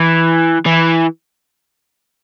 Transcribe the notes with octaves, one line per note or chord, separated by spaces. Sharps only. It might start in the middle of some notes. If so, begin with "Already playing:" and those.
Already playing: E3
E3